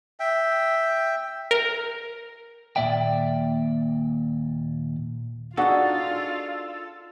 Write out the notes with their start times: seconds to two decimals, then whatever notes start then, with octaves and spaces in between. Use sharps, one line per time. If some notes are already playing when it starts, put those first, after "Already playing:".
0.20 E5 G5
1.51 A#4
2.76 D#2 A#2 A#3 D5 E5 G5
5.57 D4 D#4 F4 F#4 G#4 A4 F#5